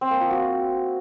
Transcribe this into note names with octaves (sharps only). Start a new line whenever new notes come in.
C4
A#3
F3
F#4